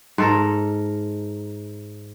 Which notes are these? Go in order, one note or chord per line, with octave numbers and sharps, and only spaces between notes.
G#2 A4 A#4